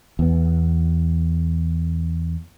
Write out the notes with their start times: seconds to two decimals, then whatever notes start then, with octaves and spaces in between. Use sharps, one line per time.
0.19 E2 B3